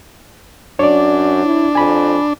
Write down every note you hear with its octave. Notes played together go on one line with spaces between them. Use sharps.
F#2 D4 C#5 D5
E4
F2 G#5 B5